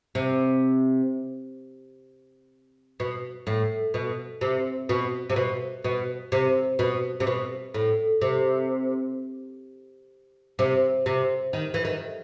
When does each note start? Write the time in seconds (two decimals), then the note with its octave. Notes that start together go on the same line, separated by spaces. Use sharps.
0.15 C3
3.00 B2
3.47 A2
3.94 B2
4.41 C3
4.89 B2
5.30 C3
5.36 B2
5.84 B2
6.32 C3
6.79 B2
7.20 C3
7.27 B2
7.74 A2
8.21 C3
10.59 C3
11.06 C3
11.53 D#3
11.74 E3
11.85 D#3